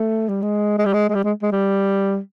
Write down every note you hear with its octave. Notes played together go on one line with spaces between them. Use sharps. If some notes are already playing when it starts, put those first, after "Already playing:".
Already playing: A3
G3
G#3
G#3
G3
G#3
G#3
G3
G#3
G#3
G3